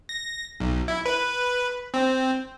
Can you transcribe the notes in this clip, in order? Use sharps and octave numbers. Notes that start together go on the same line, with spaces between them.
A#6
B1
E4
B4
C4